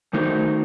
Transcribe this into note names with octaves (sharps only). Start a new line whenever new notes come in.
D#3 A3 D#4 F#4 C5